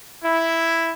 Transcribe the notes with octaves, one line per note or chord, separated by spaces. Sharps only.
E4